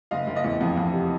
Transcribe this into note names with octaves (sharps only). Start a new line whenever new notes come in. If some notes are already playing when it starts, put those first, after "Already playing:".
F#1 D#5 F5
F#1
D#5 F5
E2
F2
F2
C3